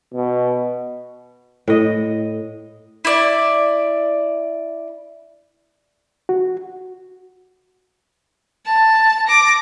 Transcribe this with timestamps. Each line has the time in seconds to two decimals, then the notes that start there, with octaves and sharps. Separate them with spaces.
0.14 B2
1.68 A2 D#5
3.05 E4 D5
6.29 F#4
8.65 A5
9.27 D6 A#6